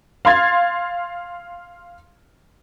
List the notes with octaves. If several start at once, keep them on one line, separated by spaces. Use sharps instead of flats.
F5 C6 G#6 A6